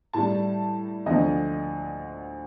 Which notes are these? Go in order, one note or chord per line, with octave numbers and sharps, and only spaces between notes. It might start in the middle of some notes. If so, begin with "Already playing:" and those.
A2 G3 A5
D2 D3 F3 D#5